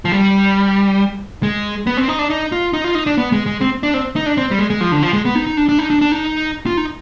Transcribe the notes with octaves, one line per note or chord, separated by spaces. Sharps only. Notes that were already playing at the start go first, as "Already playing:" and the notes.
F3
G3
G#3
B3
C4
D#4
D4
D#4
F4
D#4
F4
D#4
D4
B3
G#3
G#3
C4
D4
C4
D#4
D4
C4
G3
G#3
G#3
F3
D3
F3
G#3
B3
D#4
D#4
D4
D4
D#4
D4
D4
D#4
F4
D#4